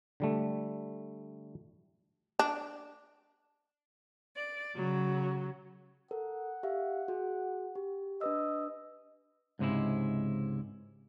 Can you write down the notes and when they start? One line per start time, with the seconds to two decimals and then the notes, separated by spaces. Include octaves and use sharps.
0.20 D3 G3 A3
2.39 D4
4.35 D5
4.75 C#3 F#3
6.11 A4 A#4 F#5
6.63 G4 E5 F5
7.08 F#4 G#4
7.75 G4
8.21 D4 B4 D#5 E6
9.59 C#2 G#2 C3 G#3 E4